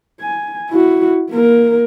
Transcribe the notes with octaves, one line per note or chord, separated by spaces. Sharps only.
G#5
E4 F#4
A#3 A#4